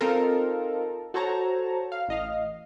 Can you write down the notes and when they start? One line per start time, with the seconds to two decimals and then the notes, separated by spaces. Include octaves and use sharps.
0.01 C4 D#4 F4 A4 A#4
1.14 F#4 A4 C5 C#5 A5 A#5
1.92 F5
2.08 A1 D#5 F5